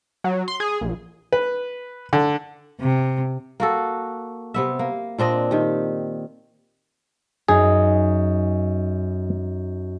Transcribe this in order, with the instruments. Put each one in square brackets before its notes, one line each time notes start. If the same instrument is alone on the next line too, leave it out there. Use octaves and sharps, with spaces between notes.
[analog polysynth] F#3
C6
G#4
A#1
[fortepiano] B4
D3
[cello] C3
[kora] A#3 F#4 A4
C3 B3 E5
A#3
A#2 C4 D4 D#5
D#3 G4
[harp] F#2 D#4 [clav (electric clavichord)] G#4